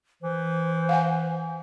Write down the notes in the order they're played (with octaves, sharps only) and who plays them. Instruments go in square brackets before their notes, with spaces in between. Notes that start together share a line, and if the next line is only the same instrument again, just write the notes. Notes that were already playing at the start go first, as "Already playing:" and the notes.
[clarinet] E3 [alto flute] C5
[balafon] F5 F#5 G#5